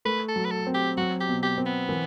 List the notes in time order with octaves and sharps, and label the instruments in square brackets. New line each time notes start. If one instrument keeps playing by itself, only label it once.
[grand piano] A3 [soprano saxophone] B4
[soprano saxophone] A4
[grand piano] F#3
[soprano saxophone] B4
A4
[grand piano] C4
[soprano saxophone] G4
[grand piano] F#3 [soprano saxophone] F#4
[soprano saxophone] G4
[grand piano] B2
[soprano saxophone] G4
[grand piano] C4
[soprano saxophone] B3
[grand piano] E3